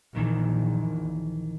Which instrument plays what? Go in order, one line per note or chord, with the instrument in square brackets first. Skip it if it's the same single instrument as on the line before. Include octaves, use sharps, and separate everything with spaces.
[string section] A#1 [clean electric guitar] F2 D#3 E3